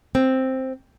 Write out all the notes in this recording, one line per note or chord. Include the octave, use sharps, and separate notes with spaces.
C4